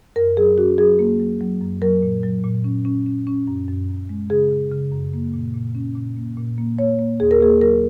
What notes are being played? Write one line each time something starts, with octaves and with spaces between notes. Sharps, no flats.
F#2 A#4
F#3 G#4
C#4 F#4
F#3 G#4
A#3
F#3
F#3
F#2
F#3 A#4
A#2
F#3
A#2
C#4
C#4
C#4
C#4
F#2
F#2
F#2
G#3
C#3 G#4
C#3
C#3
F#2
A#3
A#2
A#2
C#4
A#2
A#3
A#2
A#3
A#3 C#5
A#3
D#2 G#4
A#4
A#3 G#4
F#3 A#4